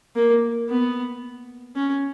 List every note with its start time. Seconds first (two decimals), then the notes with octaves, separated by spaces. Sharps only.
0.15 A#3
0.69 B3
1.76 C#4